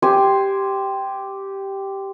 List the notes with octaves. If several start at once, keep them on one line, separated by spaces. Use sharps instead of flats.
G4 C5 G5 G#5